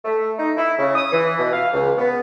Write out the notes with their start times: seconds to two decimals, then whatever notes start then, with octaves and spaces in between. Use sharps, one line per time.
0.04 A3
0.38 D#4
0.57 E4
0.79 C#3
0.95 D#6
1.12 E3
1.39 B2
1.52 F5
1.73 C#2
1.98 B3